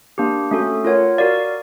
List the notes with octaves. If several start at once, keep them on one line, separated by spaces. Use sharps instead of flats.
A#3 D4 G4
A3 C#4 F#4 A4
F4 A#4 C#5 F#5
F#4 A#4 D5 F5